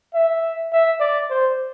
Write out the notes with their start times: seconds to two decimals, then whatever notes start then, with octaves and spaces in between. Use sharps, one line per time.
0.15 E5
0.72 E5
1.00 D5
1.30 C5